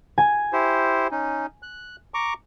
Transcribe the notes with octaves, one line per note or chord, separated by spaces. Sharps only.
G#5
E4 G4 C5
C#4 D#4
F#6
A#5 C#6 D6